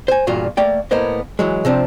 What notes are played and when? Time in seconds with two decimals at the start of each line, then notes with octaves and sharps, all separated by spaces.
0.08 C5 G#5
0.27 E2 G2 A#2 F4 F#4
0.57 A3 A#3 D5 G5
0.91 A2 A#3 B3 A#4 C5 D#5
1.39 E3 F#3 G#3
1.65 C3 F3 C4 D4